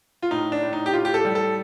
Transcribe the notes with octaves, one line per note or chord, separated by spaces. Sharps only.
F4
A2 D#4
D4
A2
D#4
G4
A2 F4
G4
A4
G3
A4